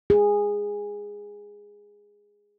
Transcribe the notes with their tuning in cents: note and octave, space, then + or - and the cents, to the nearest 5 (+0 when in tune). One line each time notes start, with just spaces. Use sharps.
G#4 -15